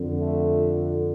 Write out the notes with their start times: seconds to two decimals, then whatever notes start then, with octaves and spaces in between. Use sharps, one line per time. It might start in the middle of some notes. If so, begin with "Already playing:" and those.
Already playing: F2 D3
0.19 A3